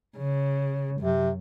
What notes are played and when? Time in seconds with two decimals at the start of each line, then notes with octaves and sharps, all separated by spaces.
0.17 C#3
1.01 F#2 C3